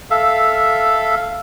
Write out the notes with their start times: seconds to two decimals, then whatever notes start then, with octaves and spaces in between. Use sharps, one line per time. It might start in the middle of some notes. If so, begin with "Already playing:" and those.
0.11 A4 E5 F5